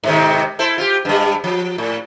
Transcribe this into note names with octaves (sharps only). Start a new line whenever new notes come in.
G#2 C3 D#3
E4 A4 C5
F4 G4
G2 G3
F3
A2